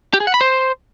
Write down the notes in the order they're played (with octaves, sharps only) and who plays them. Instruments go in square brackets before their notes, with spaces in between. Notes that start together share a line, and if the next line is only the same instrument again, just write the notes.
[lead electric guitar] G4
G#4
F#5
B5
C5